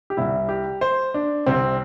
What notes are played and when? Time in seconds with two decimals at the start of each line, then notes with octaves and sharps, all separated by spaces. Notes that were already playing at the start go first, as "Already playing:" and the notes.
0.10 G4
0.17 C2 C3 G3 E4
0.49 G4
0.81 C5
1.14 D4
1.46 C2 C3 G3 C4